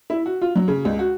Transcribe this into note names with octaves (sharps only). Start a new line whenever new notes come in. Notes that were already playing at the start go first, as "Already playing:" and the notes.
E4
F#4
F4
F#3
C#3
C#2
F#4